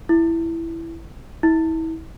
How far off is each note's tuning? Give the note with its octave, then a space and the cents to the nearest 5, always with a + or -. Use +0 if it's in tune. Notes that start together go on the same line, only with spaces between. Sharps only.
E4 +5
E4 -35